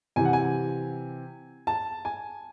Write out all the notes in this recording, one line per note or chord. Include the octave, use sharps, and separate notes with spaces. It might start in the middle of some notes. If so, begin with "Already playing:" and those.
C3 E3 G#5
F#5
G#5
A5
G#5